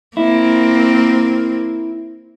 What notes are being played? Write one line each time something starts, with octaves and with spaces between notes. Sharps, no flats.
A#3 C4 E4